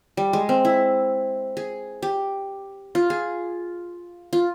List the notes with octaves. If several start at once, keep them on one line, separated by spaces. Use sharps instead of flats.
G3
G#3
C4
E4
G#4
G4
F4
G#4
F4